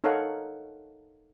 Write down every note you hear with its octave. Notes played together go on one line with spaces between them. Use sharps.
D#4 A4 A#4 C#5 F5 F#5